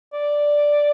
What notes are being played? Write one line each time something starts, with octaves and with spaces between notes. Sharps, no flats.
D5